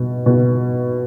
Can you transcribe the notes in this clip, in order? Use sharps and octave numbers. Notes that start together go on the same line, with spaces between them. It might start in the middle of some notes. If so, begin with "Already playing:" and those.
Already playing: B2
B2